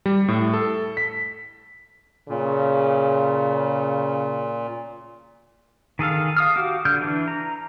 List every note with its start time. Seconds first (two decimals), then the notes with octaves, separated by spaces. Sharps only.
0.06 G3
0.28 A2
0.53 A4
0.97 B6
2.29 A#2 C#3
5.99 D#3 G#4 A4 F5
6.37 F5 D#6 F6
6.56 F#4 G4 F5
6.85 D3 F6 G6
7.01 E3 D4
7.28 A#5